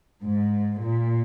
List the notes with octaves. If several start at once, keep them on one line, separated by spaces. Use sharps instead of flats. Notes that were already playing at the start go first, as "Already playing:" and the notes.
G#2
A#2